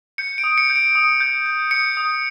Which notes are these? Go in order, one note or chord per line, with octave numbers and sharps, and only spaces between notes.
G6 C#7
D7
D#6
C#7
G6
D7
D#6
G6
G6
D#6 C#7
D#6